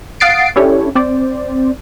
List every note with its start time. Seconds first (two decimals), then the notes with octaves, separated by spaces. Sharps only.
0.20 F5 F#5 D#6 A6 C7 D7
0.56 C#4 D4 E4 G4 A4 C#5
0.95 C4 C5 D5